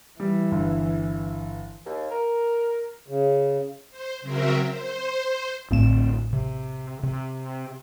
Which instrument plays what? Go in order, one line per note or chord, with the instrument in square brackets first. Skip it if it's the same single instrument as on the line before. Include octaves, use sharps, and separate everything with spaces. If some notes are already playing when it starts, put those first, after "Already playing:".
[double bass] E3 [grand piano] G3
[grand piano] G1
[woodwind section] D#2
A#4
[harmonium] C#3
[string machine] C5
C#3 F#3 C4 A#4 E5
C5
[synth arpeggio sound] A1 A2 E7 [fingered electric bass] D2 C4
[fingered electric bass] C3
C3